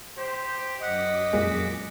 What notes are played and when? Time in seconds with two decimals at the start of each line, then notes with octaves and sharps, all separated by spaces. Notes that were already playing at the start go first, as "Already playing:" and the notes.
0.17 G4 C5
0.82 F#2 D#5 F#5 D6 B6
1.33 F2 A#2 G#3 F#4